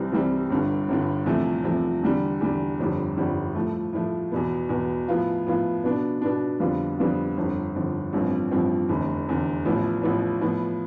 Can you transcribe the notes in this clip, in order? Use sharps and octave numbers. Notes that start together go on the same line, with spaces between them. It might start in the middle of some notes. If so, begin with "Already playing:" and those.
Already playing: C2 C3 E3 G3 C4
C2 C3 E3 G3 C4
G1 G2 D3
G1 G2 D3
E2 C3 F3 A3
E2 C3 F3 A3
E2 D3 G3
E2 D3 G3
G1 F2 D3 G3
G1 F2 D3 G3
A2 F3 A3
A2 F3 A3
E2 B2 B3
E2 B2 B3
A2 F3 B3 F4
A2 F3 B3 F4
B2 B3 D4
B2 B3 D4
F2 D3 G3 B3 F4
F2 D3 G3 B3 F4
G1 F2 D3
G1 F2 D3
A1 G2 F3 C4
A1 G2 F3 C4
F1 E2 D3
F1 E2 D3
A1 A2 F3 B3
A1 A2 F3 B3
A2 F3 B3